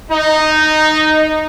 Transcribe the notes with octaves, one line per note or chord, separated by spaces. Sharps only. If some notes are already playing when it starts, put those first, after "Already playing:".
D#4